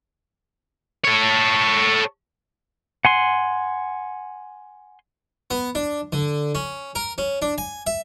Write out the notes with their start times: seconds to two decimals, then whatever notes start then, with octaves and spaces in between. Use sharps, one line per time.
1.04 A4 C#5
3.05 F#5 G#5 C6
5.51 B3
5.75 D4
6.13 D3
6.55 C#4
6.95 A#4
7.18 C#4
7.42 D4
7.58 G#5
7.87 E5